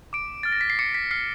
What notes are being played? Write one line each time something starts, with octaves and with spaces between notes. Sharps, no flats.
D6 D7
F6 A6
A#6
B6
C7
D6 C#7
B6
F6 C7